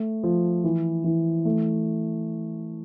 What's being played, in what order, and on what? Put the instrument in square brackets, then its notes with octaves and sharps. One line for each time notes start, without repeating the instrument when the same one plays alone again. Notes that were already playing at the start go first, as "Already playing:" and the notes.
Already playing: [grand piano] A3
F3
E3
E3
A3